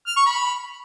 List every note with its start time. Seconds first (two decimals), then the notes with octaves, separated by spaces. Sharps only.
0.07 F6
0.16 C#6
0.26 B5